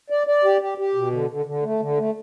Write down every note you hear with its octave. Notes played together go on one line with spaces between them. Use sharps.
D5
D5
G4
G4
G4
B2
D3
D3
D3
A3
D3
A3